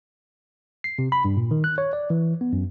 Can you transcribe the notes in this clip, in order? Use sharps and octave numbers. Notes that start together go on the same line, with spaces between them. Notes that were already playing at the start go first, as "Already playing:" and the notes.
C7
C3
B5
G2
A#2
D#3
F#6
C#5
D5
E3
B3
F#2